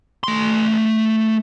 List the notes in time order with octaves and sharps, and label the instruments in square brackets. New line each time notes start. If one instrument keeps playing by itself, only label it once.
[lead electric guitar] A3 C6